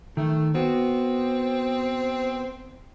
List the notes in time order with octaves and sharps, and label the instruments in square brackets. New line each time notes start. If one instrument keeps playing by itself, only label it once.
[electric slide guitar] D#3 [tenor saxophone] A3
[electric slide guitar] B3 F#4 [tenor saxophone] C4